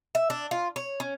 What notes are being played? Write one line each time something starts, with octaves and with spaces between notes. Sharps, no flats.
E5
D4
F4
C#5
C#4